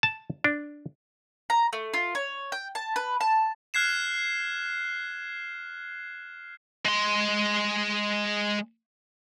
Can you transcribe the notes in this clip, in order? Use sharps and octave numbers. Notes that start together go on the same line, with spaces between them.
A5
D4
A#5
A3
F4
C#5
G5
A5
B4
A5
F6 F#6 G#6 C7 E7
G#3 C6